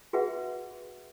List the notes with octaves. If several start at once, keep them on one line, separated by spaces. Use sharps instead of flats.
F#4 G#4 B4 E5 F#5